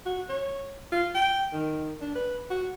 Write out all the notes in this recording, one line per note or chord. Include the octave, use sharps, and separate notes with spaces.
F#4
C#5
F4
G5
D#3
D4
B4
F#4